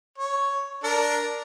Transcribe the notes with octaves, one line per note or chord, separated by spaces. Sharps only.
C#5
D4 A#4